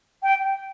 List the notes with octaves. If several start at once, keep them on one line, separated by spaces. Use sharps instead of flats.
G5